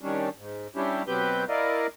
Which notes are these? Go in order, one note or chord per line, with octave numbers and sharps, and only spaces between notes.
D#3 G3 C#4 D4
G#2
G3 C#4 D4 E4 G4
B2 F#3 C4 G4 B4 G6
E4 A#4 D5 D#5 F5